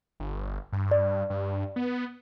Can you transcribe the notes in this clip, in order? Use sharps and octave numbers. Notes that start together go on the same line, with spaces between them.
G1
G2
D5
G2
B3